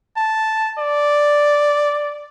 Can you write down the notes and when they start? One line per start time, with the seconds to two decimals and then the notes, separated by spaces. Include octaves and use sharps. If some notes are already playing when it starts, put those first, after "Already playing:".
0.17 A5
0.79 D5